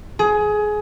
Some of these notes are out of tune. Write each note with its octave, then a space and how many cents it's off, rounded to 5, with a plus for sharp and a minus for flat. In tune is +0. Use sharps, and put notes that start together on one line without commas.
G#4 +20